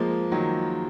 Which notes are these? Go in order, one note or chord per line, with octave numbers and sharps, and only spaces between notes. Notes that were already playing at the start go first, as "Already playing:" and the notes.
Already playing: F3 G#3 A#3
D#3 F#3